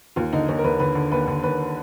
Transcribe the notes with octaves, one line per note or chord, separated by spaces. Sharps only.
D#2 F4
D3 D#4
D#2 D#4
A#4
D#2 B4
D3 B4
D3
D#2 B4
D3
D#2 B4